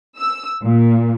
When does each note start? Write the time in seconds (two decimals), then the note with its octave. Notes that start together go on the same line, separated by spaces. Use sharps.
0.18 E6
0.64 A#2